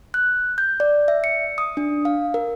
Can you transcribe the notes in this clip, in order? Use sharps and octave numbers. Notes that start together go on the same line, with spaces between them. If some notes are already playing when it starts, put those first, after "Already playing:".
F#6
G6
D5
E5
C#7
D#6
D4
F5
A#4